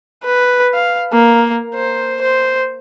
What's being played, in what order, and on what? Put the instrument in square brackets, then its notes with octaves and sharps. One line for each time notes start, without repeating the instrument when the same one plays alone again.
[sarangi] B4
F5
A#3
C5
C5